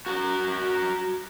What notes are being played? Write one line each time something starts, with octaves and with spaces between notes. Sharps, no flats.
F#4 A#4